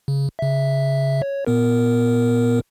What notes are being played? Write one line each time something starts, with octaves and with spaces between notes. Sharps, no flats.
C#3
C#3 E5
C#5
A#2 B3 A#4